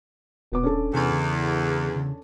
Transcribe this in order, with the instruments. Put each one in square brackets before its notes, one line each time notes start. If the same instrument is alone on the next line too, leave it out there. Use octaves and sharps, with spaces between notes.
[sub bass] D#1 [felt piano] B2 B3 D6
[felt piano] C#4 D4 A4
[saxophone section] E2 [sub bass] C3
[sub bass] C#3
C#3